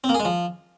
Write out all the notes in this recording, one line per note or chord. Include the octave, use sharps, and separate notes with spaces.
C4
A#3
G#4
G#3
F3